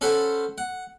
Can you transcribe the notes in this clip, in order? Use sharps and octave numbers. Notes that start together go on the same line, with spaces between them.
C#4 A4 C5 F#5 B5
F#5